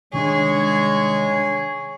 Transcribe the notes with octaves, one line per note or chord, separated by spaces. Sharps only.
C2 D#3 G#3 D4 G#4 C#5